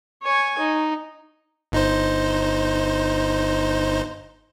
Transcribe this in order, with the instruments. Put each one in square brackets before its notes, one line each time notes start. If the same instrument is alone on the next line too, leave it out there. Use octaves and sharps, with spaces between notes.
[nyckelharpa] C#5 G#5
D#4
[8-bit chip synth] G1 D#4 C5